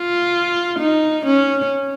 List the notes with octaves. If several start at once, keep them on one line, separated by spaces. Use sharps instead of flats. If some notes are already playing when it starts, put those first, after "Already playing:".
Already playing: F4
D#4
C#4